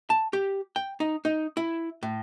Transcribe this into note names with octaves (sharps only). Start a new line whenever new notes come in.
A5
G4
G5
D#4
D#4
E4
A2